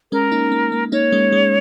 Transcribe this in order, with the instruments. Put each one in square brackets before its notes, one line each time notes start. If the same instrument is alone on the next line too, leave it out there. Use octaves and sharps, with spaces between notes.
[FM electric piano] G#3 C#4 [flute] A#4
[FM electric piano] A#3 D#4
A#3
A#3
[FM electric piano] A#3 D#4 [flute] C#5
[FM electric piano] G#3 C#4
G#3